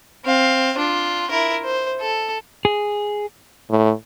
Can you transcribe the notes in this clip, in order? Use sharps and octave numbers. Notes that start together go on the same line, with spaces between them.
C4 F5
D4 F4
E4 A#4
C5
A4
G#4
A2